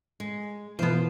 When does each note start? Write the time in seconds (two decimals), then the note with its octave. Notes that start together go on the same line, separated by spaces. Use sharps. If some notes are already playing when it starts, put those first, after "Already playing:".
0.20 G#3
0.79 B2 E3 F3 B3 F4 C5